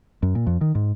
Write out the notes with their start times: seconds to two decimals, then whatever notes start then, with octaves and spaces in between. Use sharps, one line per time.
0.22 F#2
0.35 A#2
0.47 F2
0.61 D#3
0.75 G#2